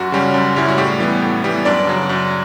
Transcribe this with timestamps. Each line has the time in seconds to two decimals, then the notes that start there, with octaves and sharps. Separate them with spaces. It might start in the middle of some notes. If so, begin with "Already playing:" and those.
Already playing: F#2 F#4
0.12 C#3 G3 C#4
0.34 F#2
0.56 C#3 G3 C#4 E4
0.68 F#4
0.78 A2 G3 G4
1.00 E3 G3 B3
1.22 A2
1.43 E3 G3 B3
1.65 F#2 D4 D5
1.87 C#3 F#3
2.09 F#2